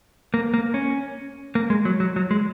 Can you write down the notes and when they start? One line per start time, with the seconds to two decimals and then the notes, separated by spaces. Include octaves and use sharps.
0.34 A#3
0.54 A#3
0.74 C#4
1.55 A#3
1.70 G#3
1.85 F#3
2.00 F#3
2.16 F#3
2.31 G#3